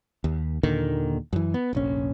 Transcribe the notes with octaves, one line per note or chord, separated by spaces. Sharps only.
D#2
D#2 A#2 D3 D#3
F#2 E3
B3
F1 A#1 C#4